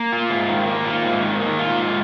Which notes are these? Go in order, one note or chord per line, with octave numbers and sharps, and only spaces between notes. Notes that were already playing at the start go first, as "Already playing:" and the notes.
Already playing: A#3
F4
G#2
D#3
A#3
F4
G#2
D#3
A#3
F4
G#2